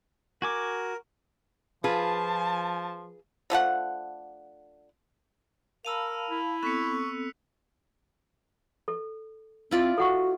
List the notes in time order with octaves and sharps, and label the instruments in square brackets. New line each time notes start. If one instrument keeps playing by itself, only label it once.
[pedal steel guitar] F#4 G#5 D6 [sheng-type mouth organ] A#4
[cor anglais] F3 [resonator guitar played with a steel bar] F4 G#4 B4 [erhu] A5
[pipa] D3 F3 A3 F#5
[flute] A#4 [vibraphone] F5 A5 B5 [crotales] E6 D#7 F7
[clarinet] E4
[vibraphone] B3 C4 A4 [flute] C#6 [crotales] F#6 B6 C#7
[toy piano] A4
[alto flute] C4 [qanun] E4 F4 D5
[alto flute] F#4 [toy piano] A4 F#5 C#6